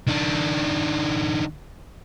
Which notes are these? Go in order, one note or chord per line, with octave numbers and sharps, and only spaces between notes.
D#3 D4